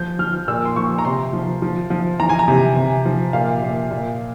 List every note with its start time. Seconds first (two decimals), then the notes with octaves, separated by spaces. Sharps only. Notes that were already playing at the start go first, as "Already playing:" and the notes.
Already playing: F3 G6
0.19 F3 F6
0.48 A#2 E6
0.65 C6
0.76 F3 C#6
0.98 A#5
1.05 C3 C6
1.33 F3
1.62 F3
1.90 F3
2.20 E3 A#5
2.29 G#5
2.39 A#5
2.48 C3
2.77 C3
3.05 F3
3.33 A#2 F5
3.62 A#2
3.91 A#2